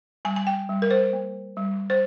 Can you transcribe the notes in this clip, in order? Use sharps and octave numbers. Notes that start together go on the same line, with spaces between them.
G3 G#5
G#5
G5
G3
A#4
C5
A#3
G3
C5